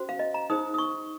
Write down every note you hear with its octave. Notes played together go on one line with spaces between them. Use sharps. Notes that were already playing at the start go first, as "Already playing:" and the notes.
Already playing: C#4 F#4 C5
F5
D#5
A#5
D#4 G#4 C5 D#6
D#6
C#6